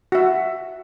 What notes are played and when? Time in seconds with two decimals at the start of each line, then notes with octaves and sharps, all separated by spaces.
0.12 F#4 E5